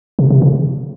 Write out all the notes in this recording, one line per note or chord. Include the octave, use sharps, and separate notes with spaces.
C3
C3
C#3